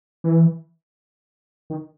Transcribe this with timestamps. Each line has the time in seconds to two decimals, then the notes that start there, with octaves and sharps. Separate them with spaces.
0.24 E3
1.70 D#3